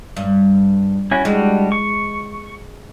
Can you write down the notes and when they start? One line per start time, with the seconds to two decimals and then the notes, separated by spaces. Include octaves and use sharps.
0.17 G2
1.11 C#4 E4 F#4
1.25 G3 G#3 D4 E4 F#4
1.72 C#6